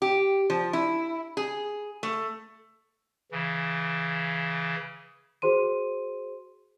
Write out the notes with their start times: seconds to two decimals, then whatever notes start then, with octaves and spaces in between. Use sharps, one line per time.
0.02 G4
0.50 F3
0.73 E4
1.37 G#4
2.03 A3
3.31 C#3 E3
5.42 F#4 G#4 C5 C6 D#7